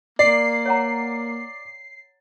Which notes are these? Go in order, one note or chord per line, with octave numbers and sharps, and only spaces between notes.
A#3 D5 C7
C#5 F#5 A#5